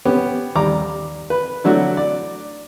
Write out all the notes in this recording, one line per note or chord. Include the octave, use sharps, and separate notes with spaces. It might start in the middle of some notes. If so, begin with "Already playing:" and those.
B3 C#4 G4
D#2 G3 A#5 D6
B4
D3 F#3 A3 D4 E4 F#4
D5